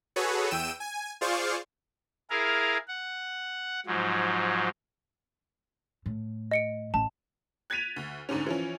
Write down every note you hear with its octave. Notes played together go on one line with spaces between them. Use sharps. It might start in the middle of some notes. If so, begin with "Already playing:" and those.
F#4 G#4 A4 B4 C#5
E2 G5 E6 D#7 E7
G#5
F4 G#4 C5 D5 F5 C#6
E4 G#4 A#4 F5
F#5
G#2 F3 F#3
A2
D#5 C#7 D7
A1 A5
F#6 G#6 A6 B6 D#7 F7
D2
D2 G#2 D3 C#4
E3 F3 C#4